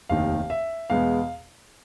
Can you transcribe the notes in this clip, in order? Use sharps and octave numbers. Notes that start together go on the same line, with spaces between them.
F1 D#2 D#3 F5
E5
E2 B2 G#3 B3 F5